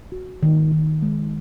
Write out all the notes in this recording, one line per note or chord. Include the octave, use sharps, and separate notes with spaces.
F#4
D#3
D#3
G#3